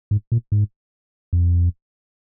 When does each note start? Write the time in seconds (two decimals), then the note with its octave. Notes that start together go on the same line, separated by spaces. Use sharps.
0.11 G#2
0.32 A#2
0.52 G#2
1.33 F2